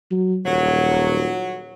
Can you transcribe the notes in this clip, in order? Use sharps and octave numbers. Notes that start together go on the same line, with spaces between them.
F#3
D#1 F#3